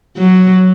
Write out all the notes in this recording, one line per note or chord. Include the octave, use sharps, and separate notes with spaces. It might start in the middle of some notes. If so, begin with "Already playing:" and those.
F#3